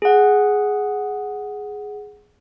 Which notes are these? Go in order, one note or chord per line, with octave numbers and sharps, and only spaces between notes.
G#4 F#5